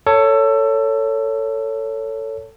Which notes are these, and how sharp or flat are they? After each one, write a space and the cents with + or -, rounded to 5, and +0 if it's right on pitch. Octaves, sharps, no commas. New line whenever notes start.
A4 +20 C#5 +10